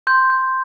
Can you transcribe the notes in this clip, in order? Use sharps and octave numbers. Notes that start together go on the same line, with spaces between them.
C6 G6
G6